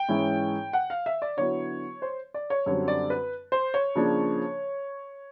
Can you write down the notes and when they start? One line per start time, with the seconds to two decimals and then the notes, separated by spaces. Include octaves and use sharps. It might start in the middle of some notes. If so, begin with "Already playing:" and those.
Already playing: G5
0.08 G#2 E3 G#3 C#4 E4
0.73 F#5
0.90 F5
1.06 E5
1.22 D5
1.37 D3 F#3 B3 E4 C#5
2.02 C5
2.34 D5
2.50 C#5
2.66 F#2 D3 G3 C4 C#5
2.88 D5
3.10 B4
3.52 C5
3.74 C#5
3.95 C#3 F3 A#3 D4